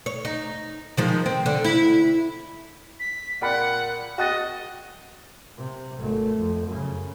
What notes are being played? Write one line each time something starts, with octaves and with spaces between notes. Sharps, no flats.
C#5
D#4
D#3 F3 G#3
C4
D3
E4
B6
A#2 D5 F#5 G5 B5
F#4 D#5 G5 F#6 A6
C3
G#1 A3
F2
F#2 C#3